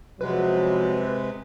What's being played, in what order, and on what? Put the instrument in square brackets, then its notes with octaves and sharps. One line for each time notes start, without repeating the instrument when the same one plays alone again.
[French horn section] F#2 F3 F#3 [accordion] C3 G#3 [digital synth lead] B4